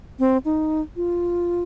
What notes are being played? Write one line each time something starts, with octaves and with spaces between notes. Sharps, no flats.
C4
D#4
F4